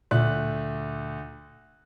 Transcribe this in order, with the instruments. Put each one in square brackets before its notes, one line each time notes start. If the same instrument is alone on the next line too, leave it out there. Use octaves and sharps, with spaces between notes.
[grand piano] D2 A3 F#6 [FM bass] A#2